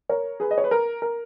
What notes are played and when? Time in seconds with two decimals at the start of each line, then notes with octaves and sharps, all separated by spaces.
0.09 A#4 C#5
0.40 G#4 B4
0.51 D#5
0.58 C#5
0.64 B4
0.71 A#4
1.02 A#4